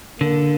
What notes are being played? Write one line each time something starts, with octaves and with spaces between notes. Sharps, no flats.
D3 A#3